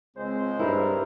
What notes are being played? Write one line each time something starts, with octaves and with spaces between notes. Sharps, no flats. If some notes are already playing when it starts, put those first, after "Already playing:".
C#2 G#3 C4 C5
G2 E4 A#4